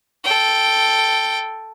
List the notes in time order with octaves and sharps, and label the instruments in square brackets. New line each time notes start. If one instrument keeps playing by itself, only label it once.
[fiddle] A4 G5